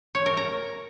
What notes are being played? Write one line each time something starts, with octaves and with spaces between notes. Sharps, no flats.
C#5
A#4
A#5